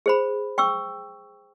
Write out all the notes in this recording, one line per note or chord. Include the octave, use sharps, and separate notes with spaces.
G#4 C5 B5
G5 C#6 D6 E6